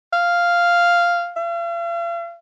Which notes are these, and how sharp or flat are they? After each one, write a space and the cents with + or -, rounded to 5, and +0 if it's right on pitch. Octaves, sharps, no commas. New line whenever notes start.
F5 -5
F5 -45